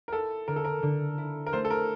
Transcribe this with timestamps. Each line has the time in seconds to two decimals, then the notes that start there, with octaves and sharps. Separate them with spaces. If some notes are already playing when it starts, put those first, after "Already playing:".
0.08 A#4
0.12 E4 A4
0.47 D3 A#4
0.56 A4
0.65 A#4
0.82 D3
1.18 E4
1.47 A#4
1.53 A3 C5
1.65 A4
1.70 A#4